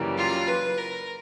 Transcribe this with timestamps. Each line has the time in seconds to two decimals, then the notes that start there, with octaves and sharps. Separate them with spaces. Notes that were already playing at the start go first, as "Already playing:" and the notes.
Already playing: F#2 C#3 E3 G3 A#3
0.18 F4
0.48 B4
0.78 A#4